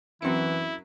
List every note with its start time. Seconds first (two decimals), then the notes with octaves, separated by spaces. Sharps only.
0.22 F#2 E3 F#3 C4 E4 C#7